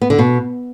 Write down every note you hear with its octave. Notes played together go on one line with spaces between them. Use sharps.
B3
D3
B2